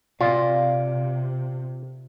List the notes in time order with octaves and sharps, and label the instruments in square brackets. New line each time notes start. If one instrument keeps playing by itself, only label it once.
[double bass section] C3 [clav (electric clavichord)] F4 [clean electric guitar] D5 F5